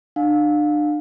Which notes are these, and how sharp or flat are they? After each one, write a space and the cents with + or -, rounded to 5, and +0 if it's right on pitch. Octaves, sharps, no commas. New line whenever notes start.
D4 +35 F5 +25